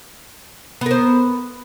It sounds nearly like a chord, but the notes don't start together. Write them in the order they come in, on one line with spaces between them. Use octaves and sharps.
B3 A#4 C5